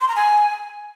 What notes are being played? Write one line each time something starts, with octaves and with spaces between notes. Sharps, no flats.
C6
A#5
G#5